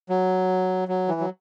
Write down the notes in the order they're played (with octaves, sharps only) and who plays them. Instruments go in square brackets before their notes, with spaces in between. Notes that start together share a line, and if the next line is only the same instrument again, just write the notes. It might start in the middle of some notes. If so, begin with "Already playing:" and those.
[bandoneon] F#3
F#3
E3
F#3